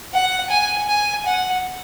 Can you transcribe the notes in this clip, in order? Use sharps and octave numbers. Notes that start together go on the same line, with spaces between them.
F#5
G#5
G#5
F#5